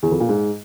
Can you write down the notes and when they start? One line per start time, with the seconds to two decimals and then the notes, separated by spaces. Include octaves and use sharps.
0.03 E2
0.11 F2
0.20 A#2
0.29 G#2